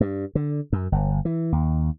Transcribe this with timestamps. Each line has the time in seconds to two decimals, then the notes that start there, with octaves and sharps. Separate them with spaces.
0.01 G2
0.35 D3
0.73 F#2
0.92 G1
1.25 E3
1.52 D#2